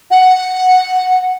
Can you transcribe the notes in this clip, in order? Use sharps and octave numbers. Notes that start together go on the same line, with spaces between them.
F#5